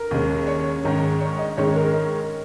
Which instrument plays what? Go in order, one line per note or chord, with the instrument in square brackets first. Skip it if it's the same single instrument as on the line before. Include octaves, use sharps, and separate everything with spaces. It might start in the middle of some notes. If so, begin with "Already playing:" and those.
Already playing: [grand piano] A#4
[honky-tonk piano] D#2 C#3 G#3 C#4
[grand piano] C#5
[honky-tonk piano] G#2 D#3 C#4 G#4
[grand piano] C#5
D#5
[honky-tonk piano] G#2 D#3 G#3 C#4 [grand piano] C#5
[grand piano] A#4
D#5